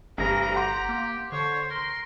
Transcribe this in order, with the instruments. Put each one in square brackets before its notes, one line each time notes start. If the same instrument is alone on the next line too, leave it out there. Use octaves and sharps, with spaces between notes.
[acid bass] G1 [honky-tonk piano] D2 G2 C3 [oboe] A#4 [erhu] A#5
[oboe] G4 [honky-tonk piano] F#5 C6
[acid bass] A#3
[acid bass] D3 [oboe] C5 [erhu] C#5
[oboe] A#4 [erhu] C6